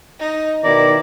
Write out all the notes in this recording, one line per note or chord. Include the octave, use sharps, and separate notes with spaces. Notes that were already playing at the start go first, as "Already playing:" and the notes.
D#4
B2 D#3 E4 D5 A#5